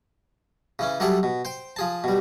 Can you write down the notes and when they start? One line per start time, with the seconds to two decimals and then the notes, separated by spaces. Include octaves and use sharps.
0.79 C#3 E3 C#4
1.00 F#3 G3 G#4 A4 D5 E5
1.23 B2
1.45 C5 G5
1.76 F3 G#4 A5
2.04 B2 G3